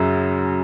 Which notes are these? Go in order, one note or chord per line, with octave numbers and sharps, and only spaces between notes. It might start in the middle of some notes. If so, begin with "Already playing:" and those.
Already playing: F#2 C#3 F#3